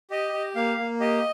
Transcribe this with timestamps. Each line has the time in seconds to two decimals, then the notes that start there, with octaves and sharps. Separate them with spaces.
0.11 G4 D#5
0.33 G4
0.55 A#3 F5
0.77 A#3
1.00 G4 D#5